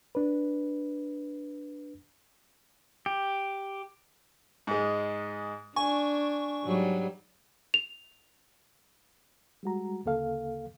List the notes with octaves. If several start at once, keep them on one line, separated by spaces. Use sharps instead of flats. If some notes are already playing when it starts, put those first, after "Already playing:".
D4 B4
G4
G#2 G#3
D4 G#5 C#6
G#2 F#3 G3
F7
G3 G#3 F#4 A#5
D2 C#3 A#3 A4 F5